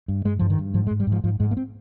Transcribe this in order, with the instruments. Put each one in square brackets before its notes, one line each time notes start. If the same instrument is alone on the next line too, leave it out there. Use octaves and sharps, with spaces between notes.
[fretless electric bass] G2
G2 G#3
G2 F3
D#3
G2
G#2 F3
G#3
G#2
G3
G#2 F3
G#2 F3
G#2 G#3
A#3
C4